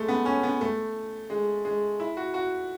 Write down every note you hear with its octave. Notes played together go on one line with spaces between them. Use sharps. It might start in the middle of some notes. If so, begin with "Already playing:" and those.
Already playing: G#3 A3
B3
C#4
B3
A3
G#3
G#3
E4
F#4
F#4